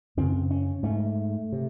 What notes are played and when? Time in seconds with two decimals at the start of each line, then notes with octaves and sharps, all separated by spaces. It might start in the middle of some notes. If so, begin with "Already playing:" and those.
0.17 F#2 C#3 C4
0.51 C#4
0.83 G#2 A3
1.52 C3